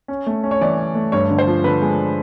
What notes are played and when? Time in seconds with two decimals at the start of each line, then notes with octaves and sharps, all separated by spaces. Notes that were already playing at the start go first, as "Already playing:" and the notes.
0.08 C#4
0.27 A3
0.44 C#4
0.51 C#5
0.61 E3 D5
0.78 C#4
0.95 A3
1.12 G2 C#5
1.30 D3
1.38 C5
1.47 F3
1.64 D3 B4
1.82 G#3